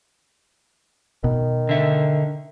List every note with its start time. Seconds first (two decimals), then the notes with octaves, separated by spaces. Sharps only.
1.24 B2 D#3
1.69 D3 E5